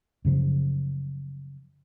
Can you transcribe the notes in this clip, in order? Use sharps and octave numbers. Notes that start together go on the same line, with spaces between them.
F#2 C#3 F3